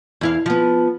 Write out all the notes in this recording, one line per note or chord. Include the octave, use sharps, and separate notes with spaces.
E2 E4 F5
F3 B3